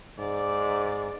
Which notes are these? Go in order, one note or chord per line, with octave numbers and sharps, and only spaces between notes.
G#2 D5